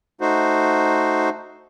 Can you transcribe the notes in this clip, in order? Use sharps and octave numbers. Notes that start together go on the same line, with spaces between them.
A3 D#4 F#4 C5